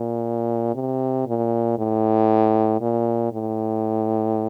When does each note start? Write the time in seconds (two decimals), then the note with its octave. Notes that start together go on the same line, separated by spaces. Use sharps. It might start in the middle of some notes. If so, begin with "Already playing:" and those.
Already playing: A#2
0.75 C3
1.27 A#2
1.78 A2
2.81 A#2
3.32 A2